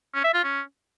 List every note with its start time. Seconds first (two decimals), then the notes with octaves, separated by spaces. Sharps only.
0.14 C#4
0.24 E5
0.34 F4
0.43 C#4